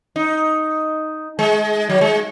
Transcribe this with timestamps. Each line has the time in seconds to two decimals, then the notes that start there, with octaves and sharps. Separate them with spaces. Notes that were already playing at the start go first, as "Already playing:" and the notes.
0.16 D#4
1.39 G#3
1.89 F#3
2.01 G#3